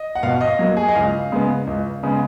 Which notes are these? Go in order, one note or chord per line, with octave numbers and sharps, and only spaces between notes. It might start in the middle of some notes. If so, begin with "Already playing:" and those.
Already playing: D#5
F#5
B2 F5
D#5
F#3 A#3
G#4
D#5
C#2 F5
C#3 G#3 B3
C#2
C#3 G#3 B3